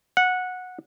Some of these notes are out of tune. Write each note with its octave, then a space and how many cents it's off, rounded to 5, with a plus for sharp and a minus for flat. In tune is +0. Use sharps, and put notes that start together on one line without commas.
F#5 -15